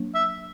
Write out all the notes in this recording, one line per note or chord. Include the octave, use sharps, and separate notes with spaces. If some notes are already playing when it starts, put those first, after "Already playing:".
Already playing: F#3 A#3 D4
E5